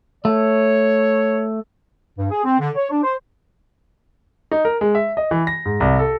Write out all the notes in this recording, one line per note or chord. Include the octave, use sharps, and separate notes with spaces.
A3 C#5
G2
G#4
C4
D3
C#5
D4
C5
D#4
A#4
G#3
E5
D#5
E3
A#6
G#2
C2
A4